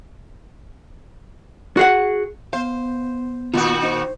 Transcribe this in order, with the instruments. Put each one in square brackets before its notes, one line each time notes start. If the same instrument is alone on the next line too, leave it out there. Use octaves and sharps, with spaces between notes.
[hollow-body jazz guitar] F#4 G#4 F#5
[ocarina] B3 [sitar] C5 [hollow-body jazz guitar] F5
[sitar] A#2 D#3 F#4 [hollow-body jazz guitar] A#3 B3 F4
[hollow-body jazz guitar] D#4 [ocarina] C5